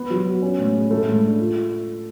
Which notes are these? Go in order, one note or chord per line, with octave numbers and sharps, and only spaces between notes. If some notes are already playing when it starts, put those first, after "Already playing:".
Already playing: B3 B4
F#3
F#4
C#4
A2
G#3
A2 A3
A2
D4
F4